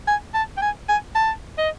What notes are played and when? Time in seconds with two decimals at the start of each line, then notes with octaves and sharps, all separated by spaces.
0.08 G#5
0.34 A5
0.57 G5
0.62 G#5
0.89 G#5
1.15 A5
1.58 D#5